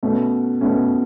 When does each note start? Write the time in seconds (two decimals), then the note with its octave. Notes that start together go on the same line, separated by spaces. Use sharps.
0.03 B2 A3 C#4
0.61 B2 A3 C#4